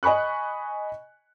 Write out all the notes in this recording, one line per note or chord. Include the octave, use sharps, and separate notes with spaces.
D#5 G#5 B5 C#6 F#6